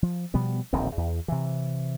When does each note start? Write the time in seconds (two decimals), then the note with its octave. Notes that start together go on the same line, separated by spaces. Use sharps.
0.02 F3
0.34 B2 F3 G3 B3
0.73 D1 A#1 D#3 C4
0.97 E2
1.28 C3 E3